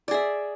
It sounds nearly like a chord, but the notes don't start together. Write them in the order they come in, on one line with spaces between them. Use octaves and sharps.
D5 G#4 E5